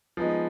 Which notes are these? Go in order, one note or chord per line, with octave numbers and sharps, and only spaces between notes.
F3 G#3 B3 D#4